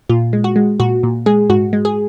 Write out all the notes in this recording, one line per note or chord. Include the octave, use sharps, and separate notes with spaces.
A#2 F4
G#3
F#4
G#3
A#2 F#4
A#2
G#3 G#4
G#2 F#4
G#3
G#4